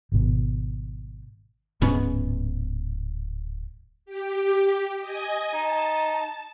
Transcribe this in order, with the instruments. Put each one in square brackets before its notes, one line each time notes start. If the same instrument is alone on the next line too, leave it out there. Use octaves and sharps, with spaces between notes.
[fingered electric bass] G#1 B2
[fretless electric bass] D1 G#2 B3 C#4
[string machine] G4
D#5 G#5
[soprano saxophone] D#4 [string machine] A5